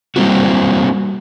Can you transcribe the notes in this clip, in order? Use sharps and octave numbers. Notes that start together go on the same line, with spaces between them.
G3 A#3 C4 E4 F#4